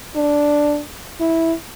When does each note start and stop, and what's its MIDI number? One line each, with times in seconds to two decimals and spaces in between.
0.15 0.80 62
1.20 1.53 64